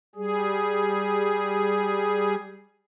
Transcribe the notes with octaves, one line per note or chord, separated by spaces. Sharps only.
G3 G#4